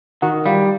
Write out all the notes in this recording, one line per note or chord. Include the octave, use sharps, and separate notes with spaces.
D#3 F#4
G3 F4